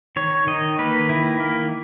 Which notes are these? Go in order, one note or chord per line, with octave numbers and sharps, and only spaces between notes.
D#3 C#5
D#3 D#5
A#3 B4
D#3 E4
A#3